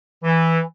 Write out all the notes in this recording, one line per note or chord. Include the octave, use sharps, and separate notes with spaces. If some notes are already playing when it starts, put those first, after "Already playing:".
E3